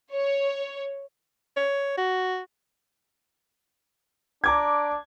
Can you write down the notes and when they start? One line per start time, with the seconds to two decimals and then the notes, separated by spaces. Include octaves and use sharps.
0.14 C#5
1.57 C#5
1.97 F#4
4.44 D4 A#5 D6 G#6